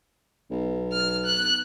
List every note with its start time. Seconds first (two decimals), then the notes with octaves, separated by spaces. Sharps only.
0.51 B1
0.92 F6
1.25 F#6